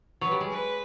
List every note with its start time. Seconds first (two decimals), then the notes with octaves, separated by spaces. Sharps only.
0.21 F#3 B4
0.31 G3
0.40 G#3
0.50 B4